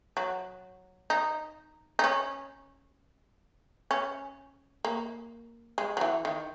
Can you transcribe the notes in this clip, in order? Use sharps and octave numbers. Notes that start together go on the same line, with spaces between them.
F#3
D#4
D#4
C#4
C#4
A#3
G#3
F#3
E3
D#3